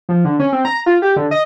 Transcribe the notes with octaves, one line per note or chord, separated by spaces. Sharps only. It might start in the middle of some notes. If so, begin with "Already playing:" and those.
F3
D3
C#4
C4
A#5
F4
G4
D3
D#5